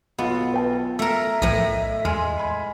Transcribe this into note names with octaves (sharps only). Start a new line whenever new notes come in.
B1 B3 F4
B4 G5 A5
A3 A#4 E5 E6
B1 A2 F3 D#5
E2 G#3 G#5 C6 F6
G#5 B5 C6